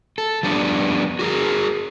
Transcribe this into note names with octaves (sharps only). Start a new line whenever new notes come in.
A4
F3 G3 B3 D4
F#4 G#4 A#4